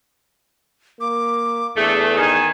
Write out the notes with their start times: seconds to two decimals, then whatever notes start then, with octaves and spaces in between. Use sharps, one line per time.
1.00 A#3 D6
1.77 E2 A3 D4 G#4
2.17 D#3 G#5